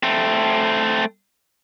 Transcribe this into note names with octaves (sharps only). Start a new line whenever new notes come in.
A3 C4